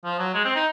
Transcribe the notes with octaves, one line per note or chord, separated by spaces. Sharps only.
F3
F#3
G#3
C4
D#4